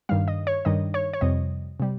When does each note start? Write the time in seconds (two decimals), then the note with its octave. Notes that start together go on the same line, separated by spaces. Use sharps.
0.09 G2 D#3 G3 F5
0.28 D#5
0.47 C#5
0.65 G2 D#3 G3 D#5
0.94 C#5
1.14 C#5
1.21 F2 C3 G3 D#5
1.80 C3 G3